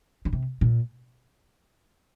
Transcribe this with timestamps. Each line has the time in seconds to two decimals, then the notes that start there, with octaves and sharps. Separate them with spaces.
0.25 D3
0.33 C3
0.61 A#2